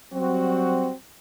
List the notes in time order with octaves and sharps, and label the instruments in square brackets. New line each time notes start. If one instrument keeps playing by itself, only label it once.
[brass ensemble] F#3 G3 C4 F#4